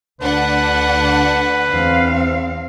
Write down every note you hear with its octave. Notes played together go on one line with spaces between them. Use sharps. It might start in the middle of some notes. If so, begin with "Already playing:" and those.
D2 D4 B4 F#5
E2 C4 F5